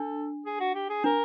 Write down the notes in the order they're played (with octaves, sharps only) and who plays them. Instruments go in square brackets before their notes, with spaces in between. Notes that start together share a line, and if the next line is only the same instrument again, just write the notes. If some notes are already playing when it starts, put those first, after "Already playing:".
Already playing: [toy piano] D4 [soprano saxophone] A4
[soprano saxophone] G#4
F#4
G4
G#4
[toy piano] D4 [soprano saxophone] A#4